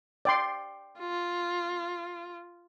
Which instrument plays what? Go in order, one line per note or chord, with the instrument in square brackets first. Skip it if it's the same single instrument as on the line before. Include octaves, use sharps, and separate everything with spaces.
[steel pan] D5 G5 C6
[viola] F4